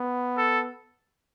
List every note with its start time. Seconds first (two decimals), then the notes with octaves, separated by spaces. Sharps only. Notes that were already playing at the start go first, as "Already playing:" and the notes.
Already playing: B3
0.38 A4